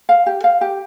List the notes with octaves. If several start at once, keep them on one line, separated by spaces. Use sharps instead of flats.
F5
G4
F5
G4